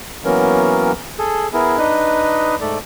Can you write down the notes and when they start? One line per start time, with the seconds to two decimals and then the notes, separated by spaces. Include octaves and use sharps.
0.25 E3 F#3 A#3 B3 C#4 A#4
1.19 G#4 A4
1.53 B3 E4 G#4 A#4
1.78 D4 D#4 B4 D#5
2.61 G#2 A3 A4 D5